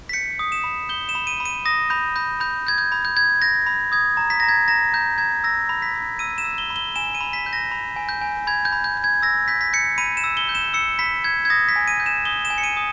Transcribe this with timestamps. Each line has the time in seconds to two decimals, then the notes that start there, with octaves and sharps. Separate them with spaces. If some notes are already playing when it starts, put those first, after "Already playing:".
0.09 B6
0.13 G6 C#7
0.39 D#6
0.52 E7
0.64 B5
0.89 G6 G7
1.09 E7
1.15 B5
1.27 D#7
1.40 B5
1.45 D#7
1.65 D#6 A#6
1.90 B5 G6
2.16 B5 G6
2.40 B5 G6
2.67 G6 G#6
2.78 G6
2.92 B5
3.05 G6
3.16 G6 G#6
3.42 G6 A#6
3.66 B5
3.92 D#6 G#6
4.17 A#5
4.30 B6
4.40 A#5 A#6
4.49 G#6
4.68 A#5 A#6
4.93 A#5 G6
5.18 A#5 G#6
5.44 E6 A#6
5.69 B5
5.82 B6
5.95 B5
6.19 E6 D#7
6.38 E7
6.44 E6
6.58 G7
6.70 B5
6.76 G7
6.96 G#5 E7
7.15 D#7
7.21 B5
7.33 B6
7.46 G6
7.53 A#6
7.72 B5
7.96 G#5
8.09 G6
8.22 G#5
8.47 B5 G#6
8.65 G6
8.72 B5
8.84 G6
8.97 G6
9.04 G#6
9.22 E6 A#6
9.48 G6 B6
9.61 B6
9.73 G6 C#7
9.98 B5 D#7
10.17 E7
10.24 E6
10.37 G7
10.49 G6
10.55 E7
10.74 E6 C#7
10.99 B5 B6
11.24 G6 G#6
11.45 G#6
11.50 D#6 A#6
11.69 B6
11.76 G#5
11.88 D#7
12.00 G6
12.06 E7
12.25 D#6 G7
12.45 E7
12.50 G#5
12.58 C#7
12.64 D#7
12.77 D#6